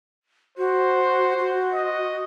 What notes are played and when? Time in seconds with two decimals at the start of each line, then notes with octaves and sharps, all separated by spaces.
0.58 F#4 C5
1.39 F#4
1.74 D#5